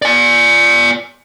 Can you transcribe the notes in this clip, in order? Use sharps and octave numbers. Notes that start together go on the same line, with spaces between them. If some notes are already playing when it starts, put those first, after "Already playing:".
D5 G#5